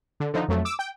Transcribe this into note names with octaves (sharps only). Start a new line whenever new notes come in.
D3
D3 F3 D#4
F2 F#3 A3
D6 E6
G5